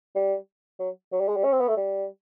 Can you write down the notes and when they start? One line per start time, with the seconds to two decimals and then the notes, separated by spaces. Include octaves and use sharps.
0.15 G3
0.79 F#3
1.12 F#3
1.20 G3
1.28 G#3
1.36 G3
1.44 C#4
1.52 C4
1.60 B3
1.68 A3
1.77 G3